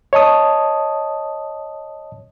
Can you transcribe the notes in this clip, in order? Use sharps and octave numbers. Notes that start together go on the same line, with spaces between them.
C#5 D#5 A5 D#6